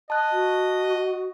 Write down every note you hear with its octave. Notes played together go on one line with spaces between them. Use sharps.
D#5 A5 F#6
F#4